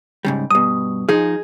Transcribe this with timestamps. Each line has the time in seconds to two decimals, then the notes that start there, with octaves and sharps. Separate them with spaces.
0.25 G#2 C#3 G3
0.51 G2 B2 D#6
1.09 F3 D#4 G#4